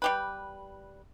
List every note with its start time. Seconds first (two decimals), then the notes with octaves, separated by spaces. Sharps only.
0.02 G3 G4 B4